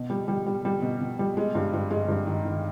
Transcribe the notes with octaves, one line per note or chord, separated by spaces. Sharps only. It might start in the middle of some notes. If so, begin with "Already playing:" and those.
Already playing: B2
G3
G3
G3
G3
B2
B2
G3
G#3
G2
G2
G#3
G2
D#3
D#3